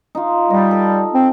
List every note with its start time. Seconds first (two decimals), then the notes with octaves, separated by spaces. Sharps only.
0.15 D#4 F4
0.50 G3 D#5
0.71 A4
1.13 C4